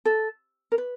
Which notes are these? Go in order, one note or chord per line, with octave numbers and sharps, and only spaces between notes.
A4
A#4
B4